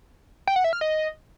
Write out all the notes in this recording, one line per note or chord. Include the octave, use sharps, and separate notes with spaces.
G5
F#5
E5
F6
D#5